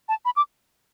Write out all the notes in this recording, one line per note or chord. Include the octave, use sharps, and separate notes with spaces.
A5
B5
D6